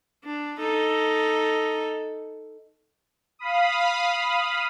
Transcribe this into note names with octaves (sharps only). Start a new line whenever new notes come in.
D4
D#4 A4
F5 B5 D#6